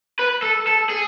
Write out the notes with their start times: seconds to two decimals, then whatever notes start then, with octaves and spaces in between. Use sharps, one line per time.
0.19 B4
0.43 A4
0.67 A4
0.89 G#4